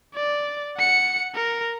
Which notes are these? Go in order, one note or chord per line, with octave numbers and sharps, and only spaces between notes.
D5
F#5 C#7
A#4